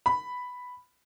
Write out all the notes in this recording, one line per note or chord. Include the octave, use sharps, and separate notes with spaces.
B5